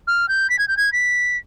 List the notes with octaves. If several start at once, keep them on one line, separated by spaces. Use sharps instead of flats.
F6
G6
B6
G#6
G6
G#6
B6